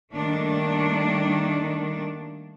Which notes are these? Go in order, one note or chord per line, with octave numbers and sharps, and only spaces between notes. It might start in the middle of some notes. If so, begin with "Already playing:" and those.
D#3 G3 A3 A#3 D4